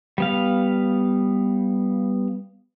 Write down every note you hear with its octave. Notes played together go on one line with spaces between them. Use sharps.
G3 B3 F5